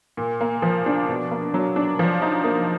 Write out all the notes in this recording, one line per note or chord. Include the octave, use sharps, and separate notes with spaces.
A#2
A#3
F3
D4
B2
A#3
F#3
D4
F3
D#4
A#3